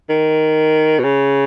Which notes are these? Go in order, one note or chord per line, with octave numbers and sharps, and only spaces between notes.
D#3
B2
C#3